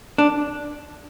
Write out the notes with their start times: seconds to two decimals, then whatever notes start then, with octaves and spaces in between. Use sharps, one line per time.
0.18 D4